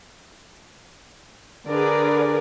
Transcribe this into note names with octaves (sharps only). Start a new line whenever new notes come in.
D3 G#4 A#4 B4 D5